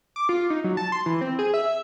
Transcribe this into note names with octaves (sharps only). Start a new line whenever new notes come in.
D6
F4
D#4
F#3
A5
C6
E3
C4
G#4
E5